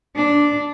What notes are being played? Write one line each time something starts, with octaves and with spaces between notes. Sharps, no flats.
D4